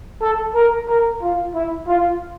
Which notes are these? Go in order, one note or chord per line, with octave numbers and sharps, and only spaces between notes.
A4
A#4
A#4
F4
E4
F4